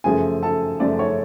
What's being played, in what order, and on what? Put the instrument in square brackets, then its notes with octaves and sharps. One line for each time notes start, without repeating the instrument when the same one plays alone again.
[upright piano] F#2 C#3 F3 A3 G#4 G#5
A4 A5
F#2 C#3 F3 A3 D5
C#5 C#6